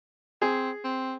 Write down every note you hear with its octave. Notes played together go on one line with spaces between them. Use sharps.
C4 G#4
C4